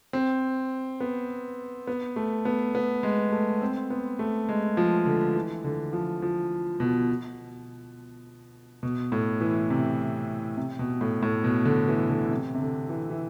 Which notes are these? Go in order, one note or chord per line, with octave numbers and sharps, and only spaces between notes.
C4
B3
B3
A3
B3
B3
G#3
A3
C4
B3
A3
G#3
F3
D3
E3
D3
F3
F3
B2
B2
A2
E3
C3
C3
B2
A2
A2
B2
D3
E3
D3
C3
C3
D3
E3
E3